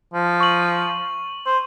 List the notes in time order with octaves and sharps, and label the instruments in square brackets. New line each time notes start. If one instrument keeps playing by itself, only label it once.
[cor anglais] F3
[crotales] C#6 F#7
[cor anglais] C5